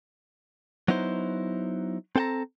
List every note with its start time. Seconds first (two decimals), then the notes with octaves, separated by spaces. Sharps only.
0.88 F#3 B3 D#4 E4 C5
2.16 C4 A4 G5 A5 A#5